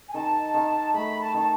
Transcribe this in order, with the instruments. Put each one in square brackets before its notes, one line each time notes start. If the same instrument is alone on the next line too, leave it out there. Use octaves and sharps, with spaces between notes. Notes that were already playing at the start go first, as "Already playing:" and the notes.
[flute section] G#5
[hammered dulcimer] D#3 [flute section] A5
[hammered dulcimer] D#3
[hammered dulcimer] A3 [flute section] B5
[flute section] A5
[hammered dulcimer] D#3 [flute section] A5